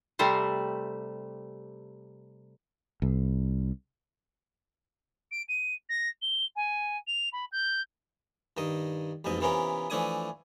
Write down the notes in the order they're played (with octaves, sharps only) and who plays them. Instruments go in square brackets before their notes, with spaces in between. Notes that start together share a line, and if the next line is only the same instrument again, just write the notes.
[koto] C3 G3 A3 C5
[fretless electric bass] C2
[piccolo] D7
D#7
A#6
G7
G#5
F7
B5
G6
[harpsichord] G2 D#3 D#5
A1 F2 G#2 B2 D#5
C3 E3 B3 C#4 F4 A#4
E3 F3 A3 D4 G#5 D#6